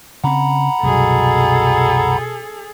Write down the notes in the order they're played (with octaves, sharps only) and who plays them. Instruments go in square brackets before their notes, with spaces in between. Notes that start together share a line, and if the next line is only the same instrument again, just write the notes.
[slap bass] C#3 C4 [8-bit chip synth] F#5 A#5 B5
[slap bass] C2 F#2 [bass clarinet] B2 [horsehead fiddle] G#4 A4